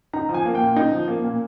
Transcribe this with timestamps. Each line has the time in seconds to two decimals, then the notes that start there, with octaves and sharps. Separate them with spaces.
0.13 D#4 A#5
0.29 F3
0.34 G#5
0.45 A#3
0.55 G5
0.61 A#2
0.76 D#4
0.92 F3
1.08 A#3
1.24 A#2